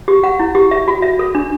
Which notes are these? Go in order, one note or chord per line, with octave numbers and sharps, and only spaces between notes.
G4
F#5
E4
G4
E5
F#4
E5
A4
D4